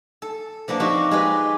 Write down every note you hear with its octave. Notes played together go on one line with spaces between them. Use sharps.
A4
F3 A#3 B3 D4
F3 C4 D#4 F#4 G4
G#3 G4 B4